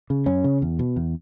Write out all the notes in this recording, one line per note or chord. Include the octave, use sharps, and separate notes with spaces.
C#3
F#2 C#4
C#3
E2
B2
E2